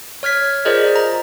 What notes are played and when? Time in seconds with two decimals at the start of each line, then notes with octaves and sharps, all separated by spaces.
0.23 C#5 F6 G#6 B6
0.65 F4 G#4 A#4 C5 D5 D#5
0.96 A#5